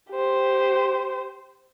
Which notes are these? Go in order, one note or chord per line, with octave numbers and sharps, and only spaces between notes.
G4 C5